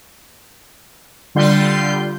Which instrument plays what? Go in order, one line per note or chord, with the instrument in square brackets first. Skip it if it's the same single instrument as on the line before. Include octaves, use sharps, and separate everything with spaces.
[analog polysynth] D3 G3 F4 C6 G6